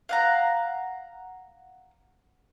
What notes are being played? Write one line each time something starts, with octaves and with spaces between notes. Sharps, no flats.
F5 F#5 A#5